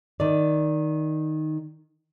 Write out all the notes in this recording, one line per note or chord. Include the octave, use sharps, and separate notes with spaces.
D#3 D5